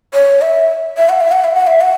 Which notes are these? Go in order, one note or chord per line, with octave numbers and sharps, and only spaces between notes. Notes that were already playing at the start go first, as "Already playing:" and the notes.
C#5
E5
E5
F#5
E5
F#5
E5
F#5
E5
F#5